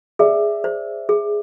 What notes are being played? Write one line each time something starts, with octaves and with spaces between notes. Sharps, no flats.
G#4 D5 E5
C5
G#4